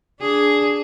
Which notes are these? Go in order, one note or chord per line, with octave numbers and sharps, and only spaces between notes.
D4 G#4